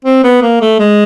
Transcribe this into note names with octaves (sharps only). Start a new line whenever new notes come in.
C4
B3
A#3
A3
G#3